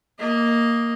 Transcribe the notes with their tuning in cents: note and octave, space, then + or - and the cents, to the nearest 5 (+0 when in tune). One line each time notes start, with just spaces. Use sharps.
A#3 +0 D#5 +0